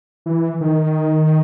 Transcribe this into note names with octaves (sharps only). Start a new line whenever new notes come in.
E3
D#3